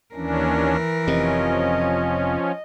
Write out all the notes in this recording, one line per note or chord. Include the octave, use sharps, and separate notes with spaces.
D#2 E3 C#4 D4 A#4
F1 C3 F3 C#4 D#5